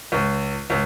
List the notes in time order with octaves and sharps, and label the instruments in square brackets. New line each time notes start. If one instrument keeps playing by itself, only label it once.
[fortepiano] C#2
C#2